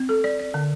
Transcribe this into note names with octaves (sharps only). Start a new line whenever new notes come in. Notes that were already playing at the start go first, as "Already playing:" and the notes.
Already playing: C4
A4
D5
D5
D3